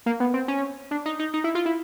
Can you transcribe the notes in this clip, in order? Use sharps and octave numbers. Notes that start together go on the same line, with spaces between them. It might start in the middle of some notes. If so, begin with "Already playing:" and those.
A#3
B3
C4
C#4
D4
D#4
D#4
D#4
E4
F4
E4